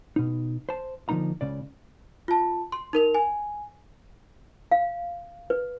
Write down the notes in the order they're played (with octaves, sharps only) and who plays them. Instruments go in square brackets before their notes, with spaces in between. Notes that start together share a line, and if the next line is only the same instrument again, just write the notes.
[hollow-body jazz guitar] B2 D#4
C5 A5
D3 F3 A#3 D#4 A#5
C#2 C#3 D5
[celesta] F4 A5
C6
D#4 A#4 F7
G#5
[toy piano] F5
B4